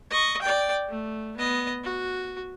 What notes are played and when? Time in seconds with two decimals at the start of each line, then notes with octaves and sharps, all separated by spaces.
0.10 D#5 C#6
0.41 D5 G5
0.88 A3
1.37 B3 D#5
1.84 F#4